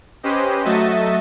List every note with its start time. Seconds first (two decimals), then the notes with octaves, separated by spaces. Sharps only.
0.23 C#4 G4 B4 C5 D#5
0.65 F#3 A3 F#4 D#5 E5 A6